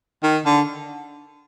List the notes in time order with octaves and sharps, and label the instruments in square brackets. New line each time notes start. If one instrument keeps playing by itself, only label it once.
[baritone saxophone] D#3
D3